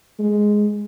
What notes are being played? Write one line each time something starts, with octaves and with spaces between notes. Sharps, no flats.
G#3